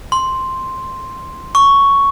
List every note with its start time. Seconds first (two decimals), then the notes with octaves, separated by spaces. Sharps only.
0.12 C6
1.55 C#6